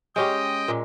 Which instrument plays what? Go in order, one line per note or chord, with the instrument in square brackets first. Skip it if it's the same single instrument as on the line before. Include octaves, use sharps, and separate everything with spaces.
[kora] G#3 C#4 G4 [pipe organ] D#5 G5
[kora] A#2 G#3